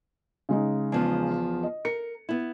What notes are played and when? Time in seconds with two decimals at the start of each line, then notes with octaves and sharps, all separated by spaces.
0.49 C#3 G#3 D#4
0.92 E2 F3 B3
1.63 D#5
1.85 A#4 C#7
2.29 B3 E4